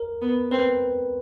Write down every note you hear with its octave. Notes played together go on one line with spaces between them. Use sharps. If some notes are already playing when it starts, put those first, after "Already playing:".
Already playing: A#4
B3
C4 B4